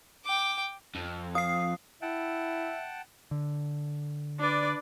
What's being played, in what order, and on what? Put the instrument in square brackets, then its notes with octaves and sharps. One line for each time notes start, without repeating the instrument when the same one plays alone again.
[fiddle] G5 D6
[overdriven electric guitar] F2
[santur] F5 [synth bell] D#6 C7
[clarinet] E4 [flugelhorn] E5 [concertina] F#5 G5 A5
[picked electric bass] D3
[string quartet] D4 B4 D5